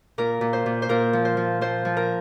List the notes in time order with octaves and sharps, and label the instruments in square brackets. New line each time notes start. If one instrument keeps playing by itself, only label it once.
[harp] A#2 A#4
A#2
C5
A#2
C5
A#2 A#4
F3
C5
F3
F3 C5
F3
A#4